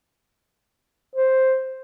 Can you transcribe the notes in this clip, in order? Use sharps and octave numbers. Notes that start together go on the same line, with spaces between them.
C5